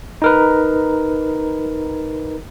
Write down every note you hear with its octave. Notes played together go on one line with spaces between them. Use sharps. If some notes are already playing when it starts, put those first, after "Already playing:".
D#4 A#4 B4